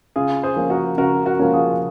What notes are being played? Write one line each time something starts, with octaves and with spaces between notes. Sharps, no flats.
C#3 F4 G#4
G#4 C5
F3 A#3 C#4
F#4 A#4
C#3 F#4 A#4
F#4 A#4
F3 A#3 C#4
F4 G#4